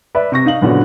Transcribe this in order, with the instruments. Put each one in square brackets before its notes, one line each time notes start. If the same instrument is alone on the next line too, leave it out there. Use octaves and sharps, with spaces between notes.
[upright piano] B4 D5 E5
C3 C#6 A#6
D#4 F5 F#7
F#1 A#2 D3 B3 C#4 F#4